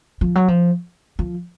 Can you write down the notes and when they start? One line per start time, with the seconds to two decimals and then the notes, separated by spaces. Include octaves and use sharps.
0.21 F3
0.35 F#3
0.48 F3
1.19 F3